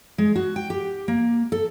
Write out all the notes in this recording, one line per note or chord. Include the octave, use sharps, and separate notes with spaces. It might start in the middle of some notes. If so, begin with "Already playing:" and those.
G#3
F#4
G5
G4
A#3
A4